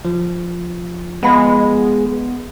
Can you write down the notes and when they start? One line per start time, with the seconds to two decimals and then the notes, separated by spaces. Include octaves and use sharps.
0.05 F3
1.23 G#3 B3 D#5 F5 B5